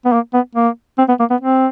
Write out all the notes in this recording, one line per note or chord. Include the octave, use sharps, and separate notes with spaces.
B3
A#3
B3
A#3
C4
B3
A#3
B3
C4